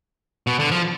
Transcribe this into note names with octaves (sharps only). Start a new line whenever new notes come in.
B2
D3
F3